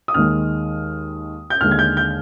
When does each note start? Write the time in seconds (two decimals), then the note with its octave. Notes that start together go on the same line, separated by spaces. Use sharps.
0.08 D#6
0.14 D#2 D#3 G#3 F6
1.50 G6
1.60 D#2 D3 G#3 F6
1.71 G#6
1.79 G6
1.97 G6